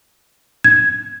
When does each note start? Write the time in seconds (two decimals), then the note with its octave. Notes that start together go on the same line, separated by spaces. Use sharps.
0.64 G#6